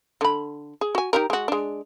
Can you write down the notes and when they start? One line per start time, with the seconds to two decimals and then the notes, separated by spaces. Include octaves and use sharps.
0.21 D3 B5
0.81 G#4
0.95 F#4 G#5
1.13 D#4 G4 A#4
1.30 G#3 F#4
1.48 G#3 D4